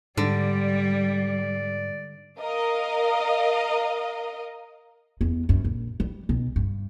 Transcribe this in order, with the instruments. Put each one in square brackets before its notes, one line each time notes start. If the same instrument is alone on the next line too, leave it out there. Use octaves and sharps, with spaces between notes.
[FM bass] G#2 [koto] D3 [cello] G3 [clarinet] D5
[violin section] A#4 D#5 F5
[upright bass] E2 B3
F#2
A#1
G3
B1
G2